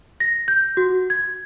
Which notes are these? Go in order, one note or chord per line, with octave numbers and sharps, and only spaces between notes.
A#6
G6
F#4
G#6